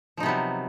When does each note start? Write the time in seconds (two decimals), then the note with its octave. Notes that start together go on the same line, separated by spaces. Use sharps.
0.17 F3
0.20 D#4
0.23 C3
0.26 B3
0.28 F#3